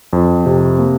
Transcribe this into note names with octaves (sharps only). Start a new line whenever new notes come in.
F2
C3
A#3